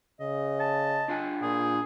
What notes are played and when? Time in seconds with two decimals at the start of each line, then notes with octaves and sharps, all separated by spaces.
0.20 C#3 D#5
0.60 A5
1.08 D4 F4 G#5
1.42 A#2 G#4